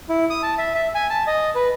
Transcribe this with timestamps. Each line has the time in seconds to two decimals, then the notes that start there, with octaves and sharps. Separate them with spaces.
0.09 E4
0.30 D#6
0.43 A5
0.58 E5
0.75 E5
0.95 G#5
1.10 A5
1.27 D#5
1.55 B4